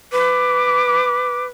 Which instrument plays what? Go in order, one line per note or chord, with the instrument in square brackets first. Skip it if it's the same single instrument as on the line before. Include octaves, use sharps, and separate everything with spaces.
[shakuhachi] B4 [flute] D6